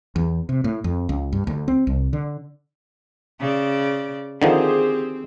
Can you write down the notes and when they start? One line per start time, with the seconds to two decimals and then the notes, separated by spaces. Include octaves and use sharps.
0.16 E2
0.49 C3
0.64 A2
0.84 F2
1.09 C#2
1.32 G2
1.47 D2
1.68 C4
1.87 C2
2.13 D3
3.40 C#3 D5
4.42 D3 D#3 F3 C4 G4 G#4 C5